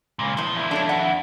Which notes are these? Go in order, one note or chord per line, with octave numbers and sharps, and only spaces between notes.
C#2 A#2
E2 A2 F3
F2 E4
D4 A4 C#5
D5 F#5